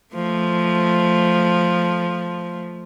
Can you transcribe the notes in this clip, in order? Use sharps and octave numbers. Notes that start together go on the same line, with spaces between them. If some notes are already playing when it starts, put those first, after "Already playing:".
F3 A3